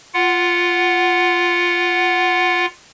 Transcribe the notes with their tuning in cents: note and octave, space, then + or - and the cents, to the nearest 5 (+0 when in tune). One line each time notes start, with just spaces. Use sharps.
F4 +0 F#5 +0